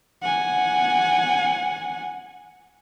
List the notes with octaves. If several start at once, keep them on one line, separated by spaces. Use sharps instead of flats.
F#5 G#5